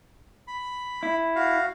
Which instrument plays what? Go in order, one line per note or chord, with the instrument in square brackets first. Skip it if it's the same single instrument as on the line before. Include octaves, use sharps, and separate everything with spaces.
[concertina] B5
[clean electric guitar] E4
[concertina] F#4 F5